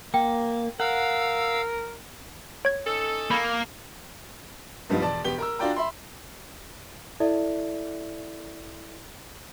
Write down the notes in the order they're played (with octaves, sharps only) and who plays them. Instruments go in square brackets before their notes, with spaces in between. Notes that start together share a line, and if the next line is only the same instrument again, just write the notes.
[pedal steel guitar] A#3 [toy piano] G5
[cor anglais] A#4 [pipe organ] F5 E6 [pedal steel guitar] F#5
[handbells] C#5 G#6
[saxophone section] C#4 D#4 A4
[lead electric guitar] A#3 [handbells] B5
[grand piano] G2 F3 G3 B3 D#4 F4
E1 D5 A5
E1 B3 G4 G7
A#4 A#5 E6
D4 F4 F#4 D5 G5 A#5
E5 B5 C6
[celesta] E4 A4 D5 E5